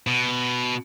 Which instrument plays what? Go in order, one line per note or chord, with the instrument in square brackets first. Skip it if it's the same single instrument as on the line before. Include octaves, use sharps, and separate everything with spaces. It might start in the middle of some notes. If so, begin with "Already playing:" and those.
[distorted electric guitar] B2